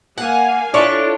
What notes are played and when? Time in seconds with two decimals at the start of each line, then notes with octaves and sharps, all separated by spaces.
0.18 A#3 F5 F#5 G#5
0.74 D4 E4 F4 A4 C#5 D5 C#6